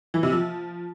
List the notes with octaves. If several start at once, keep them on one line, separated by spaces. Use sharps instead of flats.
E3
C3
F3